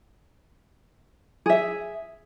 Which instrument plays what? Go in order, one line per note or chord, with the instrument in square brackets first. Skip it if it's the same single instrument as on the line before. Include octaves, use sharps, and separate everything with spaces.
[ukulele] G#4 E5